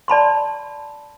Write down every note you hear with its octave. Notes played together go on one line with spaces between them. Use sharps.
D5 A5 B5 C6